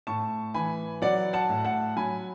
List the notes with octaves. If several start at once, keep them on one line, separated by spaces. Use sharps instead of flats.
A2 A5 C#6
E3 G#5 B5
F#3 D5 F#5
F#5 A5
A2
F#5 A5
F#3 G#5 B5